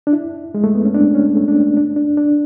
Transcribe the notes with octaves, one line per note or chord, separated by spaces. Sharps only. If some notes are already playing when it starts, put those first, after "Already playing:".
D4
E4
G#3
A3
B3
C#4
D4
C#4
A3
D4
C#4
D4
D4
D4